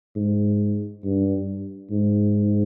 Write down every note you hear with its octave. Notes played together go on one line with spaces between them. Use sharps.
G#2
G2
G#2